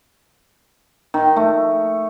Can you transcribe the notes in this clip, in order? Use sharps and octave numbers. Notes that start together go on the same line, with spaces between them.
D#3
A3